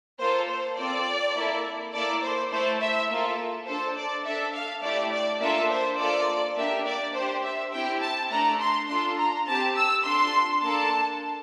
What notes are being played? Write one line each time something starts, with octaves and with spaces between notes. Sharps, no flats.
A#3 F4 A4 C5
C5
C4 F4 A4 D5
A#3 E4 A4
A#3 E4 A4 D5
C5
A3 E4 A4 C5
E5
A#3 F4 A4
D4 A4 C5
D5
D4 A4 E5
F5
A3 E4 G4 D5
D5
A#3 D4 F4 A4 E5
C5
A#3 F4 A4 D5
A#3 D4 G4 E5
D5
D4 G4 C5
E5
C4 E4 G4 G5
A5
A3 D4 A4 A#5
C6
D4 F4 A4 C6
A#5
C4 G4 A5
E6
D4 F4 A4 C6
A#3 D4 A4 A5